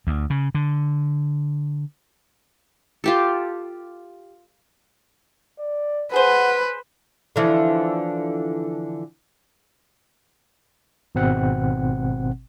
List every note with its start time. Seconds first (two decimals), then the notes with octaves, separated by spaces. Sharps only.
0.07 D2
0.30 C#3
0.54 D3
3.04 F4 G4 A4
5.59 D5
6.13 G#4 B4 C5 F#5
7.36 D3 E3 F3
11.15 G#1 B2 C4 F#5